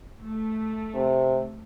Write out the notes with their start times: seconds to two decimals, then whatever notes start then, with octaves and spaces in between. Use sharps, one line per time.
0.21 A3
0.95 C3